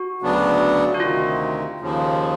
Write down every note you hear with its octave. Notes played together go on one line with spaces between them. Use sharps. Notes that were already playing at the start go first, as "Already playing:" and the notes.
Already playing: F#4
D2 C#3 F#3 B3 D4
F#4
D2 C3 D#3 F4
D#2 C#3 F3